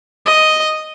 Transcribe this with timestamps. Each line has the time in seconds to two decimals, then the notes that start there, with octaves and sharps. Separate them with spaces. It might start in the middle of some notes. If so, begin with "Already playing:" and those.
0.26 D#5